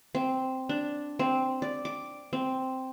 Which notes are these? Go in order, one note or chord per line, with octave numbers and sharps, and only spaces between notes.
C4
D4
C4
D5
D6
C4